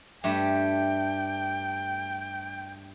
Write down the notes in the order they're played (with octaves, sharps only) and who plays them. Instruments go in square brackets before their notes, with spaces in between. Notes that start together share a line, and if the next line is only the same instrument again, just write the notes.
[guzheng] G2 A3 G4 [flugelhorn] G5